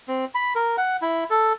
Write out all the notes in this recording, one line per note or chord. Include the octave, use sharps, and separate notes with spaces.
C4
B5
A#4
F#5
E4
A4